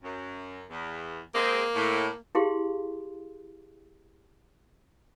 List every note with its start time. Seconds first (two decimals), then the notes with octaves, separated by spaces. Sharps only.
0.03 F#2
0.70 E2
1.34 G#3 A#3 C4
1.75 A2
2.35 E4 G4 G#4 F5 C6